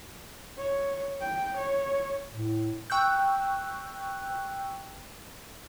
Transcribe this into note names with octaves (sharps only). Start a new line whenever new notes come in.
C#5
G5
C#5
A2
G5 C#6 E6 F#6 G6